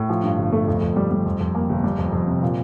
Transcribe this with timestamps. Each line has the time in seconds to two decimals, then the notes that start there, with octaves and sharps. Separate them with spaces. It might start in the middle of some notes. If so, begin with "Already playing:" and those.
Already playing: A2
0.09 F3
0.23 G2
0.38 G1
0.52 A3
0.68 F2
0.82 F2
0.96 G3
1.11 G3
1.25 F2
1.40 F2
1.55 A#3
1.69 G1
1.84 G3
1.98 F2
2.12 F2
2.27 C3
2.42 A#2